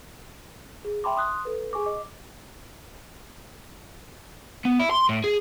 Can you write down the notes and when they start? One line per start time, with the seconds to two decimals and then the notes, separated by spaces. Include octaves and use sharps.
0.85 G#4
1.04 E5 G5 A5 B5 C6 D6
1.16 C6 D#6 F#6
1.45 A4 B4
1.73 G#4 G#5 C#6 D6
1.85 D#5 D6
4.65 B3
4.79 E4
4.91 C6
5.09 A2
5.24 G#4